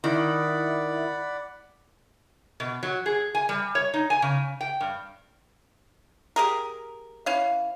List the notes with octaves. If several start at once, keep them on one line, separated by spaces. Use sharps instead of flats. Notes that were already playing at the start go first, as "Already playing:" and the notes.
D#3 E4 D5 F#5 B5
B2
F#3
G#4
G#5
G3
C#5
D#4
G#5
C#3
G5
G2
G4 G#4 A#4
E3 C#4 F5